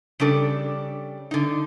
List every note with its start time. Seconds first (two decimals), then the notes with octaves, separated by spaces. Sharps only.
0.20 C#3 G3 D4 A4
1.31 D3 D#4